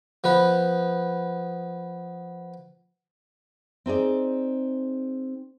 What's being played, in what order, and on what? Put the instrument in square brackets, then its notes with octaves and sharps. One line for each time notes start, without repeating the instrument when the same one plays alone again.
[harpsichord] F3 B3 B4
[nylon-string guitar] C4 D#4 G#4 D5